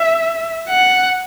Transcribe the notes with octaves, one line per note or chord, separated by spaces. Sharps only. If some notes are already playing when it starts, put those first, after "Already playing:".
Already playing: E5
F#5